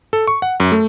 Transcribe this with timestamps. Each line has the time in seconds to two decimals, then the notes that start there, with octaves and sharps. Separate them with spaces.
0.13 A4
0.27 C#6
0.42 F#5
0.60 F#2
0.72 A3